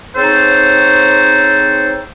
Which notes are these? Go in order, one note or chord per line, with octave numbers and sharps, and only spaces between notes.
C4 D#4 G#4 A4 C5 C#5